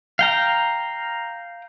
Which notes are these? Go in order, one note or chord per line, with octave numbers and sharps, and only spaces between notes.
F5 G5 A#5